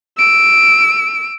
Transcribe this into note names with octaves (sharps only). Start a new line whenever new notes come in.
E6 D7